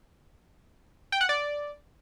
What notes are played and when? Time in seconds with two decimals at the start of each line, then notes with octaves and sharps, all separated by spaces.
1.12 G5
1.21 F#5
1.29 D5